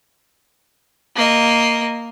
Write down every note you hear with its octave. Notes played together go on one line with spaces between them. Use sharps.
A#3 D#5